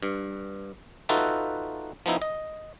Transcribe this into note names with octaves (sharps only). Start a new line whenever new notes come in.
G2
D#4 F4 F#4 A4 B4 E5
F3 B3 D#4 E4
D#5